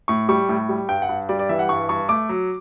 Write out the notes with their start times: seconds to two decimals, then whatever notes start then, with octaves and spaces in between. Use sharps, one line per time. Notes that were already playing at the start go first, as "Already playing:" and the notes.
0.08 A2 C#6
0.29 G3 C#6
0.49 A2
0.69 G3
0.89 G2 G5
1.02 F#5
1.09 G2
1.29 G3 D5
1.39 D5
1.49 E3 E5
1.59 F#5
1.69 G2 C#6
1.89 G2 C#6
2.09 A3 D6
2.29 F#3